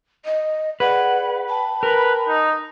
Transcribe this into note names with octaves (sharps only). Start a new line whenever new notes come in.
D#5
G#4 B4 D5 F#5
G5 A5 B5
A#4 B4
D#4